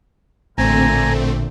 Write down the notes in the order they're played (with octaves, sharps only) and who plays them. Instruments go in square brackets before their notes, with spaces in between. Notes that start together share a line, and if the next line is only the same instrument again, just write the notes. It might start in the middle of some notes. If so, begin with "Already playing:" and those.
[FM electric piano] A1 [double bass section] A#2 D3 [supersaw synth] A3 C4 [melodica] G#5 A#5